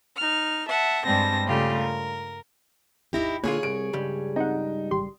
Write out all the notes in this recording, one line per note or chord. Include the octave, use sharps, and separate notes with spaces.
D#4 F6
E5 F#5 A5
G2 G3 G#3 C4 A5 A#6
C#3 G3 A3 F4 G4
A#4
G#1 D#2 D#4 E4 G4 A#6
A#2 D3 F4 G#4 C#5
C2 D7
C#2 G2 G3
C4 D#4 F#5
A1 G4 C6